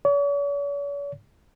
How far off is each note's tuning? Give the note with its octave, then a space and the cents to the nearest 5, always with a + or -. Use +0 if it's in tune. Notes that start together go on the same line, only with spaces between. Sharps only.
C#5 +45